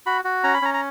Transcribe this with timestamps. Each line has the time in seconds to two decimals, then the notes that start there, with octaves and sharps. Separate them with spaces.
0.06 F#4 B5
0.25 F#4
0.44 C#4 A#5
0.54 B5
0.62 C#4 A#5
0.74 A#5